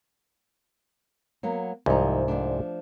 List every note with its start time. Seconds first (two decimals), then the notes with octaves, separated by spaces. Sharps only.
1.43 F#3 A#3 B3
1.86 C2 G#2 F3 D#4
2.28 F3 A3 D4